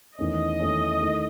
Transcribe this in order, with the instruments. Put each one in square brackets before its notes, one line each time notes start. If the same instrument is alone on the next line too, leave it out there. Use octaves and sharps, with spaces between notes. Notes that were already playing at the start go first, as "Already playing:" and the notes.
[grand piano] E2 D#3 A3 C#4 [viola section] D#5
[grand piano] E2 D#3 A3 C#4
D#3 A3 E4